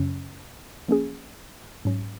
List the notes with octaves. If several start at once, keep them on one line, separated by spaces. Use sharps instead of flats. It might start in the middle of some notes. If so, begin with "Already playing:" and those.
Already playing: F#2 C#3 F#3 C#4
F3 A#3 C#4 G#4
G#2 F#3 C#4